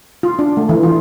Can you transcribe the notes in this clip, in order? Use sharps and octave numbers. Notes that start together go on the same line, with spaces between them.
F4
D4
A3
E3
F4